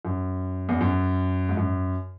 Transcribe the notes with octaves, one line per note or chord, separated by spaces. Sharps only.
F#2
E2
F#2
G#2
F#2